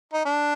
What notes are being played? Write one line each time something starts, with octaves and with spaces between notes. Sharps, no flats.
D#4
D4